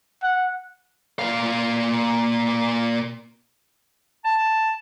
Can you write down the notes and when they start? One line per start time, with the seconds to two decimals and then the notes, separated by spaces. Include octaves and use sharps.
0.23 F#5
1.19 A#2 F5
4.25 A5